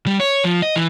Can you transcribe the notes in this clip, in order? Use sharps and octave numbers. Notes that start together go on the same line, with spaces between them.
G3
C#5
F3
D#5
E3